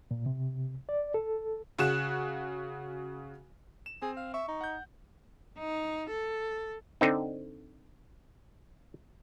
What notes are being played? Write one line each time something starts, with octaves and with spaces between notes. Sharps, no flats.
A#2
C3
D5
A4
C#3 F#4 F#6 E7
E7
C4 G#4
F5
E5 C#6
D#4
F#5 G6
D#4
A4
D3 C4 D#4